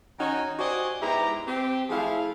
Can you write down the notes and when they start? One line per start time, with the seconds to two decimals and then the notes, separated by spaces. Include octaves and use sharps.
0.19 D#3 C#4 D#4 F#4 C#5 G#5
0.58 F#4 G4 C5 D5 D#5 G#5
1.02 G#2 G#3 B3 E4 G4 A#5
1.47 C4 G4
1.89 F3 A3 E4 G#4 F5